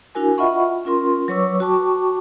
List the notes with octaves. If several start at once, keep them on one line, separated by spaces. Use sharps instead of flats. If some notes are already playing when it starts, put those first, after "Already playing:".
D4 E4 F#4 A#4 G#5
F4 D#5 E5 F#5 B5 C#6
C#4 F4 A#4 C6
F#3 B4 C#5 C#6 D6 E6
F#4 G5 A5 C#6 D6